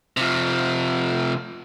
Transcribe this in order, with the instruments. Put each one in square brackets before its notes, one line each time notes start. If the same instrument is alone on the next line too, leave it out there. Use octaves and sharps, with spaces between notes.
[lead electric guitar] C3 F3